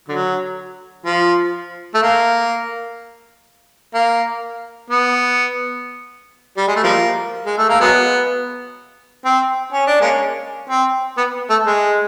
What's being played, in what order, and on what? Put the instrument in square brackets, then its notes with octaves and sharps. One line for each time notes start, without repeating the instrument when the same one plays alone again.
[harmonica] D3 F#3
F3
A3
A#3
A#3
B3
G3
G#3
A3
F3 G3 A#3
G#3
A3
A#3
F#3 G#3 B3
C4
C#4
D4
G#3 A#3 C#4
C4
B3
A3
G#3